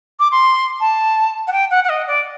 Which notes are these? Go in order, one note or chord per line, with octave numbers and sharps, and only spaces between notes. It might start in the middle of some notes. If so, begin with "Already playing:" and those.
D6
C6
A5
F#5
G5
F#5
F#5
D#5
D5